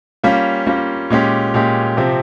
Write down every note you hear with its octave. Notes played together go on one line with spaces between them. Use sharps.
G3 A#3 C#4 F4
G3 A#3 C#4 F4
A#2 G#3 C#4 G4
A#2 G#3 C#4 G4
C3 F3 C4 G4